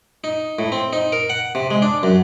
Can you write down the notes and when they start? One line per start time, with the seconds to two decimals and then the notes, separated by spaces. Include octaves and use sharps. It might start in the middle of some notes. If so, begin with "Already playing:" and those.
0.24 D#4
0.59 A2
0.72 C4
0.93 D#4
1.12 A#4
1.30 F#5
1.55 C3
1.70 G#3
1.82 D4
2.03 F#2